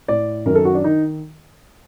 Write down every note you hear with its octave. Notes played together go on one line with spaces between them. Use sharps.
A2 D5
F#2 D#3 A#4
A4
F#4
D4
D#3 D#4